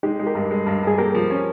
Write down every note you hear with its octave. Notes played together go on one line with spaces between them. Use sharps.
G#3 D#4 G4
G#3
G4 A#4
G2
G#3
G2
G2 G#4
A#3 G4 A#4
F3
C#4